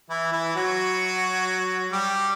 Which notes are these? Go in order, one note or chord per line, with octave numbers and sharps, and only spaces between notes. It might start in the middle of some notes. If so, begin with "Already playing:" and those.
E3 E4
E3 E4
F#3 F#4
G3 G4